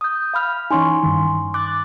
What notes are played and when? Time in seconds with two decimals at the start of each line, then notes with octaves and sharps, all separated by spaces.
0.01 D#6 G6
0.34 F5 B5 F6
0.71 E3 C#4 D#4 G#5 C6 C#6
0.84 C#5
1.03 G2 D#3
1.54 D6 F#6 A6